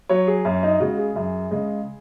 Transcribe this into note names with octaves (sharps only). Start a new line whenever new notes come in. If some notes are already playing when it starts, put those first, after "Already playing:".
F#3 C#5
G#4
F#2 C#4
D#4
C#3 G#3 F#4
G#4
F#2
C#3 G#3